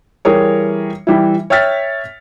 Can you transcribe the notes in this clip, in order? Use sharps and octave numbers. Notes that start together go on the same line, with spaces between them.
E3 G3 G#4 A#4 C#5
E3 G3 E4
C#5 E5 G5 F6 A6 B6